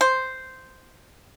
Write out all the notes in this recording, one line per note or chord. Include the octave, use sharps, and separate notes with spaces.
C5